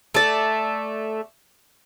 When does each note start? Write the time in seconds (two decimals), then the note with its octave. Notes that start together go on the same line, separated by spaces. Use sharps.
0.14 A3 D5